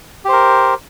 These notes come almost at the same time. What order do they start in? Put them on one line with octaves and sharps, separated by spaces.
G4 C5 A#4